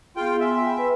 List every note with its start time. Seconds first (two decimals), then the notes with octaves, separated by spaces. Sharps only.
0.17 B3 F4 G#4 G5
0.40 E5 G#5 C6
0.66 G5 B5
0.78 B4